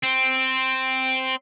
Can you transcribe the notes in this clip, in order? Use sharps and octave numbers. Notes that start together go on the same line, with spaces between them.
C4